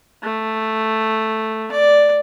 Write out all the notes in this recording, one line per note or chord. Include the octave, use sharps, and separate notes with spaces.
A3
D5